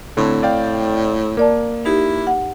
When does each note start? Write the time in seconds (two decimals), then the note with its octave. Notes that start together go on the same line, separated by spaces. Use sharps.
0.17 A2 D3 C4
0.43 D5 F5 G5
1.37 A#3 A#4 D5 A5
1.85 D#4 E4 G4
2.27 F#5